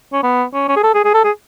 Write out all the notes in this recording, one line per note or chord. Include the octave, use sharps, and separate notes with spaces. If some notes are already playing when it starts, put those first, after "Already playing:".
C#4
B3
C#4
C#4
G#4
A4
G#4
G#4
A4
G#4